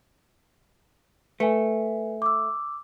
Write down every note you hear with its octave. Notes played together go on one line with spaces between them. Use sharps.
A3 B4 G#5
D6 E6